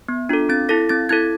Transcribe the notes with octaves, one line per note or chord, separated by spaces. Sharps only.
B3
D4 F4 A4
C4 A6
E4 A4 A#6
C4 A6
E4 A4 G#6